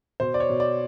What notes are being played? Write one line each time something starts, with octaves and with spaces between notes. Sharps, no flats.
B2 C5
D5
C#5
B2
D5